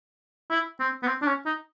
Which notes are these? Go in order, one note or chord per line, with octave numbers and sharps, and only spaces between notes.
E4
C4
B3
C4
D4
C#4
D#4